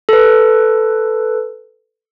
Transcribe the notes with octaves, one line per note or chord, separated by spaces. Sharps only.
A4 B4